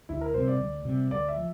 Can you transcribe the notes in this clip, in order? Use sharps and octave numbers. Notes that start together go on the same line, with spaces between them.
D2 E4
A#4
C3 G3 C5
D5
D2
C3 G3
D2 D5
E5
F3